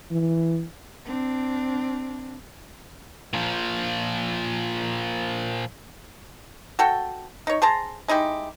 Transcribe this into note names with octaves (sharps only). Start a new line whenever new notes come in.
E3
C4 D4
A#2 F3
F#4 A4 G5
D#4 C#5
G#4 C5 A5 A#5
G#3 D#4 E4 G4